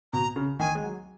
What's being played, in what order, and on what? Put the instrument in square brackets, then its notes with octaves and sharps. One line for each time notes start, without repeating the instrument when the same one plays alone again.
[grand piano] B2 [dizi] A#5
[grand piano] C#3
[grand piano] D#3 [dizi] G#5
[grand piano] G#3
F#3